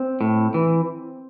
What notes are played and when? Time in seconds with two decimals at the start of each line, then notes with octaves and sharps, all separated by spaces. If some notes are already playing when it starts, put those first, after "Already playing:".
Already playing: C4
0.21 A2
0.54 E3